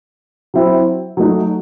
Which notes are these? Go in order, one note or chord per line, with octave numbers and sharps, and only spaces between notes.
F#3 C4 E4
F#3 A3 D#4